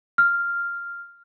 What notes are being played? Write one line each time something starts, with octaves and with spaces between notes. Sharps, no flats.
F6